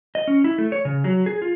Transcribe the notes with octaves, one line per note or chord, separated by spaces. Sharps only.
D#5
C#4
E4
A3
C#5
C#3
F#3
G#4
F4